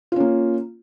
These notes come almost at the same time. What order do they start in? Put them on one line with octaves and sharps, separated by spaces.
F4 C#4 A#3